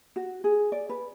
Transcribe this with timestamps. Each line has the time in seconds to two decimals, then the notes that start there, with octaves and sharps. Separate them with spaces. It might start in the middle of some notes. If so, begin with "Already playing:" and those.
0.16 F#4
0.44 G#4
0.72 D5
0.89 B4